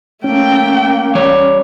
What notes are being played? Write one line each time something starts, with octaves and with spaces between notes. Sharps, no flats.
A3 A#3 C#4 G5
G3 C#5